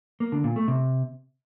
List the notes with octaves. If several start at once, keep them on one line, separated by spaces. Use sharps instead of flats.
A#3
D3
A#2
A3
C3